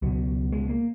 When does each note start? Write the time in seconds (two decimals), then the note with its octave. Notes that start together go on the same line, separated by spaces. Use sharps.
0.02 C#2 B2 F#3
0.52 G#3
0.69 A#3